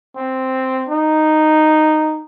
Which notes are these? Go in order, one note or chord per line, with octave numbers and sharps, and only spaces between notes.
C4
D#4